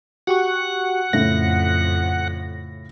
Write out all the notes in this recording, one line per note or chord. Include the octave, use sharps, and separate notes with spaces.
F#4 G4 F#5 C#6
F2 A2 C#3 A#6